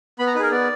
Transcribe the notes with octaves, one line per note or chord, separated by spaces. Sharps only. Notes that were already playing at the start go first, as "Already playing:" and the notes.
B3 B5
A#5
D#4 G#4 A#4 B4
B3 D5